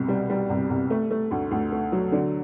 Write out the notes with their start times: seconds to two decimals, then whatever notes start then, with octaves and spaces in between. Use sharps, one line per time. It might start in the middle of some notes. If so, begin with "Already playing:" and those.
Already playing: C2 B2
0.08 G3
0.30 G3
0.49 C2
0.70 C2
0.90 A3
1.11 A3
1.31 D2
1.51 D2
1.72 A3
1.92 F#3
2.12 D3